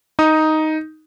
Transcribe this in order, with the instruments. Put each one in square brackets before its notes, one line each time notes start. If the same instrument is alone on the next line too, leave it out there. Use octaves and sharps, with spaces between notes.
[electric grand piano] D#4 D#6